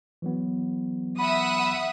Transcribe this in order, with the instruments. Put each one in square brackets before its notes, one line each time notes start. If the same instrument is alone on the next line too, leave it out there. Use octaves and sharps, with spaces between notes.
[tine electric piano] E3 F#3 B3
[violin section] E5 F#5 D#6 [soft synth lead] B5